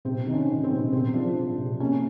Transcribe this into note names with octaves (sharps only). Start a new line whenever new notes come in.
C3 C4
D#3
C#4
D#3
C4
C3
C3 C4
F3 D4
F3
C3
A#2 C#4